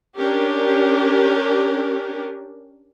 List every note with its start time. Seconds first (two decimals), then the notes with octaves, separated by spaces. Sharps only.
0.17 C#4 D4 G4 A#4